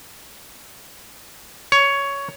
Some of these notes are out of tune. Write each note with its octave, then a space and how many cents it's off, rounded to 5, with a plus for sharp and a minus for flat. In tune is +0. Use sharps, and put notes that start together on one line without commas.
C#5 +10